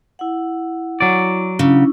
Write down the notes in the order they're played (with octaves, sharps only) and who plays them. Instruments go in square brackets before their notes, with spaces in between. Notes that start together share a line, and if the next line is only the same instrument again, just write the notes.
[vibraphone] E4 F#5
[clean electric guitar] F#3 D5
[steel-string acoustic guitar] C#3 [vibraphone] C#4 D4 E4